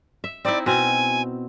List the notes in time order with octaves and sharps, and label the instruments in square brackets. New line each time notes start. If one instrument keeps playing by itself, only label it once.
[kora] E5
[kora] C4 D#4 E4 [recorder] D5
[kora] B2 C4 [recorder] G#5